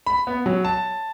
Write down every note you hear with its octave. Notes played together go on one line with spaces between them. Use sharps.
B5
B3
F#3
A5